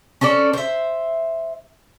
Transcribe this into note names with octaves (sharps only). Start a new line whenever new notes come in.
C#4 A4 C5 D5
C5 E5